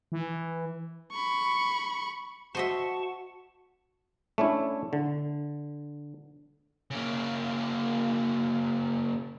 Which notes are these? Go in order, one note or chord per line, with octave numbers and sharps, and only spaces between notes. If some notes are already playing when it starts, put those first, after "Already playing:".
E3
B5 C#6
F#4 C5 D#5 E5 F#5 A5 C#6
A3 C#4 D4 E4
D3
C#3 A#3